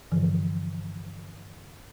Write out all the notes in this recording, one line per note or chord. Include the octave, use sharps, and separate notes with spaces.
G2 D3 E3 F3